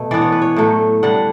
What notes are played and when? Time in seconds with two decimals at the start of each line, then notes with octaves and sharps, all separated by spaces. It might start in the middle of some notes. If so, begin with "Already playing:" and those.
Already playing: B2 A3
0.11 E3 B3 D4 D5
0.21 C#5
0.32 B4
0.42 C#5
0.56 A2 F#3 A3
1.03 D3 G3 D4 F#5